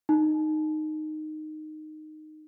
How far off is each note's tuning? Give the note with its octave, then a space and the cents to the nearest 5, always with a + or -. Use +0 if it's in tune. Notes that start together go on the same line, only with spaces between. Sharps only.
D#4 -10